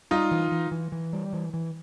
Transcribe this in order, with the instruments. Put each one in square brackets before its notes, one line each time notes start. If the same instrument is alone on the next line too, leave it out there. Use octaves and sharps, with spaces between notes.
[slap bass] G3 [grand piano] D#4 F4
[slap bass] E3
E3
E3
E3
G3
E3
E3